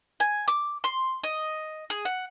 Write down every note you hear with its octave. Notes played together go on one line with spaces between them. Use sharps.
G#5
D6
C6
D#5
G#4
F#5